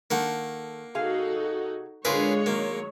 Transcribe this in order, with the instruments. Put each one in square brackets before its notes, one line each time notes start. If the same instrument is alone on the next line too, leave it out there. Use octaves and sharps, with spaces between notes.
[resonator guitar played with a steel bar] D#3 A4 [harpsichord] A#3 F#5
[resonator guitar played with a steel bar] C3 G#4 F5 [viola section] D#4 F#4 A4
[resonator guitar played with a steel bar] D3 F4 [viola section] G#3 C#5 [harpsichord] G#4 A#4 B4
[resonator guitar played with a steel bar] D#3 F#3 [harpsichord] A#3